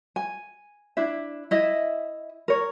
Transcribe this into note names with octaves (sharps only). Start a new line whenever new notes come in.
G#5
D4 E4 E5
E4 D#5 E5
A#4 C#5